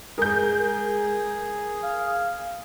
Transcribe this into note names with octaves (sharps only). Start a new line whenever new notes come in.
G#3 G#4 A#4 G6
F5